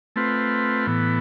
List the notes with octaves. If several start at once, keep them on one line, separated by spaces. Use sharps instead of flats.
A3 C4 F4 B4
A2 E3 B3